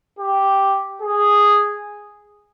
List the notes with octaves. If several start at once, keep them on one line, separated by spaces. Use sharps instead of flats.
G4
G#4